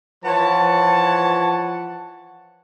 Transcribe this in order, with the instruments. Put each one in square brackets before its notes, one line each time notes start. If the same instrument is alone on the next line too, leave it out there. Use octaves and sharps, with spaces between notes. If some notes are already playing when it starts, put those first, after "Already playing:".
[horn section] E3 F3 C#5 F#5 A5